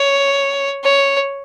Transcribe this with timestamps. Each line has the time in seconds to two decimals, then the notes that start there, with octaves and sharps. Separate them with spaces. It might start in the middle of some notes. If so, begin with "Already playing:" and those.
Already playing: C#5
0.84 C#5